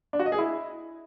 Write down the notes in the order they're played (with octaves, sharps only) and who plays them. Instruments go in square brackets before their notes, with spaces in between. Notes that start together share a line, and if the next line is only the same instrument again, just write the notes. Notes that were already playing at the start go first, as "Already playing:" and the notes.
[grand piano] D4
F#4
D#5
G#4
E4